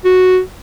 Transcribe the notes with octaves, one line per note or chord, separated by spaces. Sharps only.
F#4